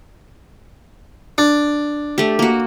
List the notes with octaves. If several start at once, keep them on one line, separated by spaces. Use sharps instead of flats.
D4
A3 G4
A#3 F#4